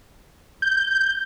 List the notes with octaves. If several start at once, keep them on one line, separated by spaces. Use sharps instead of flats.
G6